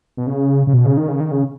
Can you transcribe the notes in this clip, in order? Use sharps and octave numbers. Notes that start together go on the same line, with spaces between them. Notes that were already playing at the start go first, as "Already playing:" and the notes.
B2
C#3
C#3
B2
C#3
D#3
C#3
D#3
C#3